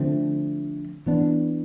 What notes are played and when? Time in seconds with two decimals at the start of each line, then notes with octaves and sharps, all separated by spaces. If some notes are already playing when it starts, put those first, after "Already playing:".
Already playing: D3 F3 A3 C4
1.06 E3 B3 D4